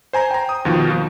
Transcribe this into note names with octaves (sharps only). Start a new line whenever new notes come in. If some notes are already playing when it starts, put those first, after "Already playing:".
C5 G#5 A#5
G5 A#5
D#6
D#2 B2 D#3 F3
F3